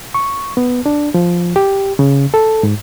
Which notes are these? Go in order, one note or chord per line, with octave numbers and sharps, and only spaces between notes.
C#6
B3
D4
F3
G4
C#3
A4
G#2